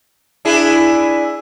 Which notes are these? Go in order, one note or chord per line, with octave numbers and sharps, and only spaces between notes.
D4 E4 G#4